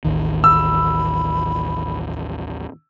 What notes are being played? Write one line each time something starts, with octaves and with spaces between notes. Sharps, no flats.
A1 D#2 D#3
B5 E6